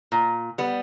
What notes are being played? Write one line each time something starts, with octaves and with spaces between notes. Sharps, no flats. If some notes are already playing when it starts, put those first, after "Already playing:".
A#2
G3 B3